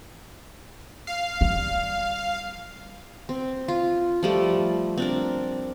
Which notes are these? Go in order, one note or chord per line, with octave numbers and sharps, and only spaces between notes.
F5
G3
C4
F4
F3 G3 A3
C4 D4 A#4